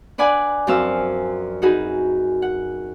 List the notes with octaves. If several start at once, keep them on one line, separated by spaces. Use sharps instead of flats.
D4 B4 D5 F#5 G#5
F#2 F3 C4 C5 F5 E6
D#4 F#4 G#4 B4
F#5